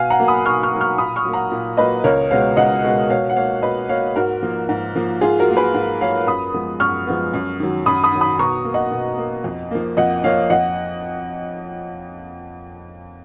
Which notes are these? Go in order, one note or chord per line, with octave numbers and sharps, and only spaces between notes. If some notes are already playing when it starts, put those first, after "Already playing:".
Already playing: B2 F5 G#5
F#5 A#5
F#3 A#3
B5 D#6
B2 C#6 F6
C#6 F6
F#3 A#3
C#6 F6
A#2 B5 D#6
C#6 F6
F#3 A#3
F#5 A#5
A#2
F#3 A#3 B4 D#5
C#2 A#4 C#5
B2 G#3 B3 C#5 F5
C#2 D#5 F#5
B2 G#3 B3
B2 C#5 F5
F#5
A#3 C#5 F5
B2 B4 D#5
A#3 C#5 F5
G#2 F#4 A#4
F3 A#3
G#2
F3 A#3
G#2 F4 G#4
F#4 A#4
F#3 A#3
G#4 B4
G#2
F#3 A#3 C#5 F5
F#2 B5 D#6
F3 G#3 B3
F#2 C#6 F6
F3 G#3 B3
F#2
D#3 F#3
F#2 B5 D#6
B5 D#6
D#3 F#3
B5 D#6
B2 A#5 C#6
A#3
D#5 F#5
B2
A#3
F2
F3 A#3
F2 D#5 F#5
F3 A#3 C#5 F5
F2 D#5 F#5